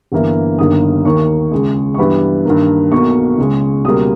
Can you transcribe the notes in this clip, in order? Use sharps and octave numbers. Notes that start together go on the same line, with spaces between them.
G1 G2 E3 A#3
G1 G2 D#3 A#3 D#6
D#2 D#3 A#3 C#6
C#2 C#3 G#3
C#6
G2 E3 G3 B3 B5
G2 D#3 A#3
B1 B2 A#3 C#6
C#2 C#3 G#3
C#2 B2 G3 A#3 D#6